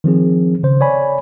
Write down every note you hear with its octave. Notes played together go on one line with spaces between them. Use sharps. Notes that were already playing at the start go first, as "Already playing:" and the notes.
D#3 F3 C4 G#4
C#3 C5
C#5 D5 G#5 B5